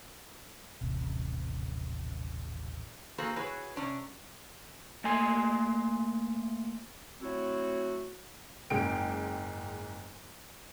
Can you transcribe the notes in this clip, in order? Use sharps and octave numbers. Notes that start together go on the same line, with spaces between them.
D#1 A1 C3
A#3 F#4 G#4 A4 C5
E4 F#4 G#4 B4 C#5
C3 C#4 D4
A3 A#3 G#5 C6
F#3 A3 C4 E4 F#4
F#1 G#2 G#4 G5 D7